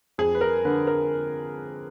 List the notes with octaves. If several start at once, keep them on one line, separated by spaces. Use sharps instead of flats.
F2 G#4
B4
A#4
D3 B4
A#4